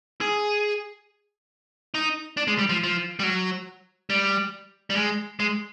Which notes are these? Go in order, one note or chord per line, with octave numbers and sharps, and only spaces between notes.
G#4
D#4
D4
G#3
G3
F3
F3
G3
F#3
G3
G3
G#3
G#3